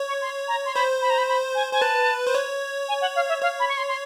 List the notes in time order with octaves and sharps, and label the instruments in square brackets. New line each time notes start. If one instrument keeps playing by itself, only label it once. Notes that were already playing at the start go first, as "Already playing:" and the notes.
Already playing: [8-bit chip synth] C#5
[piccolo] C#6
C6
A#5
C6
[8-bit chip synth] C5 [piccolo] B5
[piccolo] B5
A#5
B5
B5
G#5
[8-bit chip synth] C5 [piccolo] G#5
[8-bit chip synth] B4 [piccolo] A5
[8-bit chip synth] C5
C#5
[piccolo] G#5
F#5
F5
E5
[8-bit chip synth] C#5 [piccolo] F5
[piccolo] B5
C#6
C6
C6